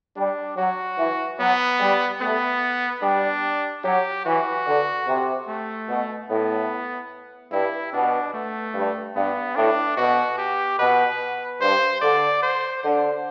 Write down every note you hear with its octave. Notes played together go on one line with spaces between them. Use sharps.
G3 D4
F#3 F#4
E3
F#3 B3
G3
A3 B3
G3 D4
F#3 G4
E3 F#4
D3
C3
A3
B2
A2 B3
G2 E4
B2 D4
A3
G2
G2 B3
A2 D4
B2 F#4
G4
B2 B4
G2 C5
D3 D5
C5
D3 C5